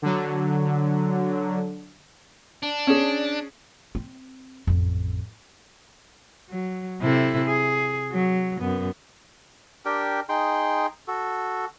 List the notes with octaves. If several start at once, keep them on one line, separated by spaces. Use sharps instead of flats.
D3 F#3
D4
C#4 G#4
C4
A1 F2
F#3
C3 E4 A4
G#4
F#3
F#2 B3
D4 G4 A#4 G5
D#4 G#4 G5 C6
F#4 A4